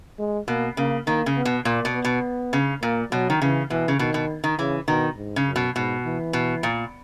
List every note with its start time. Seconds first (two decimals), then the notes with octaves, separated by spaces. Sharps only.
0.19 G#3
0.48 B2 A#3
0.77 C#3 A#3
1.07 D#3 A#3
1.26 C#3
1.36 B3
1.45 B2
1.65 A#2 A#3
1.85 B2
1.95 B3
2.04 B2
2.53 C#3
2.82 A#2 A#3
3.12 B2 F#3
3.30 D#3
3.41 C#3 E3
3.70 B2 E3
3.88 C#3
3.99 B2 D#3
4.14 B2
4.44 D#3
4.58 C#3 E3
4.88 B2 D#3
5.17 G#2
5.36 C#3
5.47 F#2
5.56 B2
5.75 G#2 B2
6.05 E3
6.33 B2
6.63 A#2